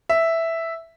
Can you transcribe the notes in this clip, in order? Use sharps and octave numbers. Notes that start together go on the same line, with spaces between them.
E5